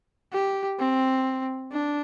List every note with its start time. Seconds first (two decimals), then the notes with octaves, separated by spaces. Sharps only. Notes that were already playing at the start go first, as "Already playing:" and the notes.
0.33 G4
0.79 C4
1.72 D4